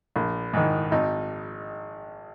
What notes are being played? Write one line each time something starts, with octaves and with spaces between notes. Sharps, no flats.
A#1
G#2 D#3
G#1 D#4